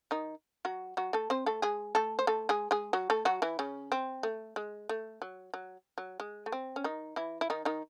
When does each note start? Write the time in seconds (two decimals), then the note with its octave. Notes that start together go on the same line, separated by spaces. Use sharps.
0.11 D#3 D#4
0.65 F#3 F#4
0.97 F#3 F#4
1.13 A3 A4
1.30 C4 C5
1.46 A3 A4
1.62 G#3 G#4
1.95 A3 A4
2.19 C5
2.27 A3 A4
2.49 G#3 G#4
2.71 G#3 G#4
2.93 F#3 F#4
3.10 A3 A4
3.25 F#3 F#4
3.42 E3 E4
3.59 C#3 C#4
3.92 C4
4.23 A3
4.56 G#3
4.89 A3
5.22 F#3
5.54 F#3
5.98 F#3
6.20 G#3
6.46 A3
6.52 C4
6.76 C#4
6.84 D#3 D#4
7.16 E3 E4
7.41 E4
7.50 D#3 D#4
7.65 D#3 D#4